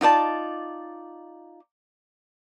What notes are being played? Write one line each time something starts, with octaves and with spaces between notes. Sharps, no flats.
D#4 F4 D5 A5